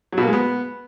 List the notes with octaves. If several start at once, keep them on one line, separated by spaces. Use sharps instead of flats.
F#3
B2
A#3
G#3
B3